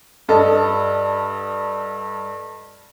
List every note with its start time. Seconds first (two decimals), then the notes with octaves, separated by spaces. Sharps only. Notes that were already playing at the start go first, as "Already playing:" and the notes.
0.28 G2 A4 D#5